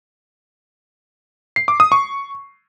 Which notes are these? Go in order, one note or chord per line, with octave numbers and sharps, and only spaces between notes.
C7
D6
D#6
C#6